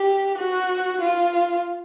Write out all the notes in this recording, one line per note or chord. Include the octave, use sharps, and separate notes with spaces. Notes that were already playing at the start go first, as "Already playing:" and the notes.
Already playing: G4
F#4
F4